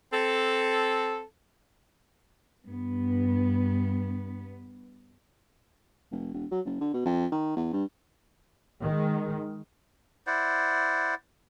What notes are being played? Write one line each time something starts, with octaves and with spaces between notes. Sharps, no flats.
C4 A4
G2 B3
F1
E1
F#3
F#1
D3
B2
F2
D#3
E2
G2
D#3 G#3
E4 C5 D5 F#5